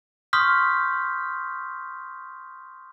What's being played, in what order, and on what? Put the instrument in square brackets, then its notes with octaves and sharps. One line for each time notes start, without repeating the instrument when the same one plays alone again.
[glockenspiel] C6 C#6 D#6 F6 G6 B6